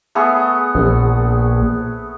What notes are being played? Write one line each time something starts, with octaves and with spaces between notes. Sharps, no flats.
A3 B3 G#4
A#1